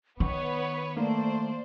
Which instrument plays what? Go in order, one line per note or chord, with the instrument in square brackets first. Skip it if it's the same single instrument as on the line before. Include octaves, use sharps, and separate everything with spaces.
[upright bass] D#3 [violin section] B3 B4 C#5 [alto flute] C#6
[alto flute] A3 [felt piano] A#3 [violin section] C5 D5